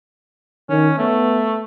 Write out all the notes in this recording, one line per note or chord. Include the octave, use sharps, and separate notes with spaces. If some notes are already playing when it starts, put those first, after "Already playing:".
D#3 C#4
A3 B3